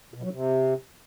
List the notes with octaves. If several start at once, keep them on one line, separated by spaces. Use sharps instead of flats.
B2
F#3
C3